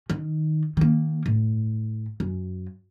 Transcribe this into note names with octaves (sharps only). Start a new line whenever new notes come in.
D#3
D#3 A#3
A2
F#2